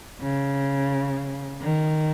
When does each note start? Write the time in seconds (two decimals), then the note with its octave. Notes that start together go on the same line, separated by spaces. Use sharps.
0.22 C#3
1.62 D#3